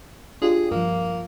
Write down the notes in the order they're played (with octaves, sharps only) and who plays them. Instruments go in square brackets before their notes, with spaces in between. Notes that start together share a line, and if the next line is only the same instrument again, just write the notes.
[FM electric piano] D4 F4 G4 [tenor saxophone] G#4
[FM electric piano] G2 F3 [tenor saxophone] A#3